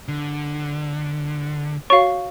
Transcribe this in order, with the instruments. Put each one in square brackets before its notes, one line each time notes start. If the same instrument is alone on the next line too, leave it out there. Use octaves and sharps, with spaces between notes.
[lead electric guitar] D3
[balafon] F#4 C#5 [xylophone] F5 C#6